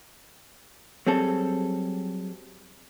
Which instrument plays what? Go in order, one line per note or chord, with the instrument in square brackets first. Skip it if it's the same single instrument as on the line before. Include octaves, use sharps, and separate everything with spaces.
[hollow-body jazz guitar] F#3 G3 C4 G#4 A4